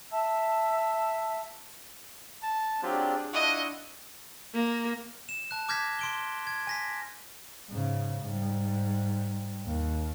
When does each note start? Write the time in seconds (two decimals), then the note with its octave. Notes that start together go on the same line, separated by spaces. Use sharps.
0.10 E5 A5 E6
2.43 A5
2.83 F#3 C4 D4 F4 G4 G#4 D5
3.33 D4 E4 F4 D#5 F#5 C#6
4.54 A#3
5.29 E7
5.51 A5 F#6
5.69 D6 F6 G6 G#6 A#6 B6
5.99 C6 D7 G7
6.47 G#6
6.67 G#5 A#6 B6
7.70 G#2 C#3
8.21 G#2 G3
9.66 D#2